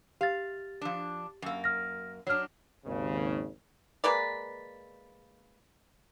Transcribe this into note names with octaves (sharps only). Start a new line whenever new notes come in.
G4 F5 A6
F3 D4
F#2 A#3
F6 A#6
F#3 D4 C#5 F6
G#1 D#2 C#3
G#3 A#3 B4 D5